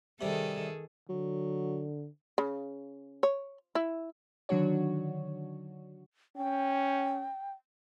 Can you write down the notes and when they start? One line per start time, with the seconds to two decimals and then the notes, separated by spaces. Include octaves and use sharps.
0.21 C3 D#3 G3 G#4 A4
1.09 D3 F#3
2.38 C#3
3.23 C#5
3.75 E4
4.49 D3 D#3 F#3 D4 F#4 C#5
6.36 C#4 G5